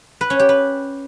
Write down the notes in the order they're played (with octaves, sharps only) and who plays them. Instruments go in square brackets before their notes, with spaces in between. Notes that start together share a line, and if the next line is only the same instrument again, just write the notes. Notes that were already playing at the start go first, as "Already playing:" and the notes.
[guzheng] B4
C#4
G4
B4